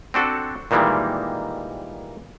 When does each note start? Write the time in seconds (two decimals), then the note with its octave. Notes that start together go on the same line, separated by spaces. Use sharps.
0.14 C4 D4 F#4 A4
0.71 A#2 D#3 E3 G3 G#3 A#3